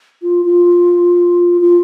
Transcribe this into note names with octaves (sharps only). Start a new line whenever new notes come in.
F4
F4
F4